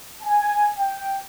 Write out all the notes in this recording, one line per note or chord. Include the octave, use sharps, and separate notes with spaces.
G#5
G5